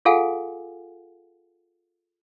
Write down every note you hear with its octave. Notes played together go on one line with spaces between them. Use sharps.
F4 G#4 A4 F5 F#5 G#5